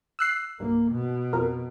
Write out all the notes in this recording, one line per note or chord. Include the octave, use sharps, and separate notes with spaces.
E6 F#6 C7
B1 G2 A#3
B2
F2 A#4